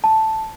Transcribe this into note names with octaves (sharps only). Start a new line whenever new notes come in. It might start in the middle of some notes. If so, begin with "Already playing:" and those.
A5